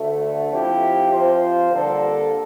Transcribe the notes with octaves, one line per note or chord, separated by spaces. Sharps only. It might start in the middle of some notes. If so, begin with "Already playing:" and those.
Already playing: D2 D3 A3
F3 C4 E4 G4
F3 C4 F4 C5
D3 G3 A#3 D4 A4